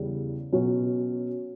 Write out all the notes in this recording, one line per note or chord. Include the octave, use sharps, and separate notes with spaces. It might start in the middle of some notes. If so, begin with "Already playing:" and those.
Already playing: E2 C#3 G3
B2 F#3 C#4 F#4 C#5